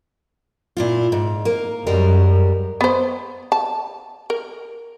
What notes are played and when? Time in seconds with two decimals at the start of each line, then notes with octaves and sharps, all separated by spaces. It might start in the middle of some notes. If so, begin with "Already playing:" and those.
0.77 A#2 E4 F4
1.12 G#2
1.45 A#3
1.86 F#2 G3 G#3 A#4
2.81 B3 C5
3.52 A5
4.30 A#4